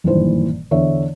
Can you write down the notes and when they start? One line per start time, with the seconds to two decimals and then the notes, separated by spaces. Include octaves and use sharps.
0.04 F#1 G2 A#2 D#3 E3 C5
0.71 E2 D3 C#5 E5